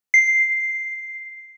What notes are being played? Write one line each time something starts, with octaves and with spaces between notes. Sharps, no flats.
C7